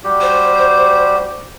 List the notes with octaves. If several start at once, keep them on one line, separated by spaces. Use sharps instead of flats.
G3 F#4 G4
C5